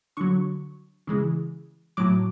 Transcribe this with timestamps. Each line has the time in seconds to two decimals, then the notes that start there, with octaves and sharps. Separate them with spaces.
0.17 D3 F#3 C#6
1.07 C#3 E3 G#3
1.97 A2 F#3 D6